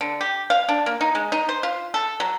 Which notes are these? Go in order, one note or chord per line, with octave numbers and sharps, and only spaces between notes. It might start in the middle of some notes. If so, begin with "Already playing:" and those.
D3
G4
F5
D4
A#3
D#4
G#3
D#4
C5
F4
A4
F#3